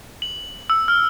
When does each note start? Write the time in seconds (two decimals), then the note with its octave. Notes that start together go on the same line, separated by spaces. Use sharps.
0.22 F#7
0.70 E6
0.88 F6